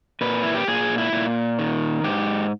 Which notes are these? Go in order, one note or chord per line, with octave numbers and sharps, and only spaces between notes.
A#2 B4
E4
G4
A#2 G#4
E4
A#2
D#3
G#2 G4